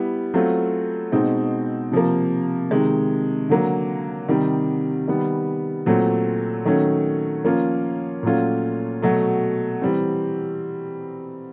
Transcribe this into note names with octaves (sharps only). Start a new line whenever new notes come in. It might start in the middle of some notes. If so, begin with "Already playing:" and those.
Already playing: G3 B3 E4
F#3 A3 C4 F4
B2 G#3 C4 D#4
C3 F3 A#3
C3 D#3 G#3
D3 F#3 A#3
C3 D#3 G3
D#3 G3 B3
A#2 F#3 A3 C4
D#3 F#3 A3 C#4
F3 A#3 C#4 F4
A#2 F#3 A3 C#4 F4
B2 F#3 A3
E3 G3 C4